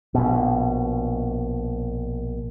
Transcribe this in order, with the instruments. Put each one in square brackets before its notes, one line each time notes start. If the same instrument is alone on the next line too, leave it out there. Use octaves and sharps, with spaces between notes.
[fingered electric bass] A#1 B2